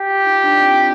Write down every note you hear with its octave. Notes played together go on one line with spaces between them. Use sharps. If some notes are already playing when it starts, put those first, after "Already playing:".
Already playing: G4
F4
D#4
D4
C4